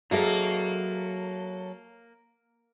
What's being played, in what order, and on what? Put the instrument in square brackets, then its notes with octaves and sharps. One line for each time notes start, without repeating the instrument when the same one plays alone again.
[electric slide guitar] F#3 A4 [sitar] A#3 [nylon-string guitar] F#4 G#4 E5